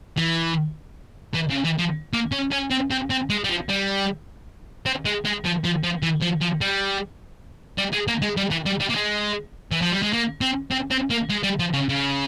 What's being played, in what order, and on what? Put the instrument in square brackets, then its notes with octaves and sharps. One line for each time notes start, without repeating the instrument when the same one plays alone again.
[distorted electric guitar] E3
E3
C#3
E3
F3
A#3
C#4
C#4
C4
C4
C4
G#3
G3
F3
G3
C4
G#3
G#3
F3
F3
F3
E3
F3
F3
G3
G3
G#3
A#3
G#3
G3
E3
G3
G3
A#3
G#3
E3
F3
G3
G#3
A#3
C4
C4
C4
A#3
G#3
G3
F3
C#3
C#3